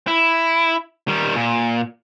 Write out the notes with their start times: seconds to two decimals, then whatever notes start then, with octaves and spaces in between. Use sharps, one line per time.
0.07 E4
1.08 D#3 G3
1.36 A#2